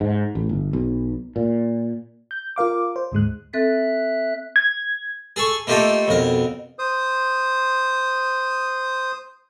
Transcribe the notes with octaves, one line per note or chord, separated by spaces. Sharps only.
G#2
A1
G1
B1
A#2
G6
F4 A#4 F5 D6
C5
D2 G#2 G#3 F#6
C4 A4 E5 F#6 A6
G#6
G#4 A4 C#6
A3 A#3 D#4 F4 G4 A4
B1 F2 A#4
C5 D#6